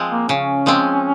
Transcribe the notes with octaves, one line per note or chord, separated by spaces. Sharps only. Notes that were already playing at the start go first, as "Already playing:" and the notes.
Already playing: F3 G#3 C4
A#3
C#3 C#4
F3 G#3 C4